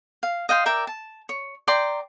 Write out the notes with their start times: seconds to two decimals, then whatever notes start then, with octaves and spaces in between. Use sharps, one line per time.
0.23 F5
0.49 D#5 F5 G5 C6
0.66 A#4 D5 E5 G5
0.87 A5
1.29 C#5
1.68 D5 G5 A#5 C6